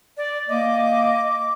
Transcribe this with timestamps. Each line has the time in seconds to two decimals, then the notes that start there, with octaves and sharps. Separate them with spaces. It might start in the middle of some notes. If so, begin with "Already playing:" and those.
0.17 D5
0.49 A#3 D#5 D6